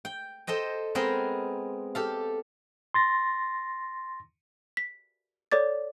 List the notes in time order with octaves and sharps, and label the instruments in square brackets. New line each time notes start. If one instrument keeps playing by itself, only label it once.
[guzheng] G5
A4 C5 D#5 G5
G#3 B3 C4 G#4 A#4 G5
G4 A4 F5
[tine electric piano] C6 A6 A#6
[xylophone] B6
A4 C#5 D5 D6 A6